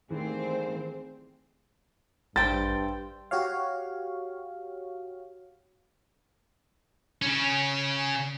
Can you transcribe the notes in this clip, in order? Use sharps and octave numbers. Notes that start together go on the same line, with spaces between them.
D#3 E3 G3 A3 A#3 C4 G#4 C5
A1 G2 C5 G5 A6
F#4 G4 C#5 F5
C#3 C#4